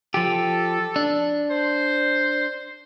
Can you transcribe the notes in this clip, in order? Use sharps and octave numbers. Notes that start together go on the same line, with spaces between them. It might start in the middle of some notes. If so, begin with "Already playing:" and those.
F3 G4 A4
D4
C5